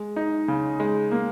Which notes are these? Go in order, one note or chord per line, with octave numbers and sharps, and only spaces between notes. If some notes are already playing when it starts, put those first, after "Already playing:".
Already playing: G#3
D#4
C#3
G#3
A#3